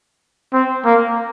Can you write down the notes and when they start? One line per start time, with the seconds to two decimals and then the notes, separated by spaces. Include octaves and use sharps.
0.53 C4
0.85 A#3